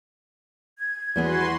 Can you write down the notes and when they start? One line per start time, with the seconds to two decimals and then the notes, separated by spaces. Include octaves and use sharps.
0.79 G#6
1.16 E2 G3 B3 F#4 G#4 B4 C6